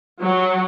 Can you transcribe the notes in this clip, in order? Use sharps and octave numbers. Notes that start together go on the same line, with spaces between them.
F#3